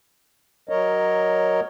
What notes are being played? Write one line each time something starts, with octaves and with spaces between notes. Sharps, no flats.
F#3 A#4 C#5 D#5